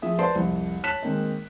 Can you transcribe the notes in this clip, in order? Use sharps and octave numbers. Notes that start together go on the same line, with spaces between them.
F3 G#4 E5 D#6
B4 C5 D5 A5 C6
C2 F2
C#5 A5 F#6 B6 E7
D#3 G#3 A#3 C4 D#4